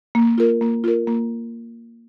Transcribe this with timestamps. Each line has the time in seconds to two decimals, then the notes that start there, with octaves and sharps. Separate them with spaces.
0.15 A#3
0.38 F4 A#4
0.61 A#3
0.84 F4 A#4
1.07 A#3